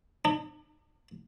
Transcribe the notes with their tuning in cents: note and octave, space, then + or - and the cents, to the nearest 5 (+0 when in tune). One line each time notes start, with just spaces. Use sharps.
D4 +45